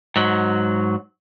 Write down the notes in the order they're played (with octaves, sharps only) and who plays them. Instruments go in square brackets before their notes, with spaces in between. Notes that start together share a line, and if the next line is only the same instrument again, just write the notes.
[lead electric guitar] G#2 F#3